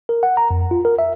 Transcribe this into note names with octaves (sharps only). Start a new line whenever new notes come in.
A#4
F#5
A#5
F2
F4
A#4
E5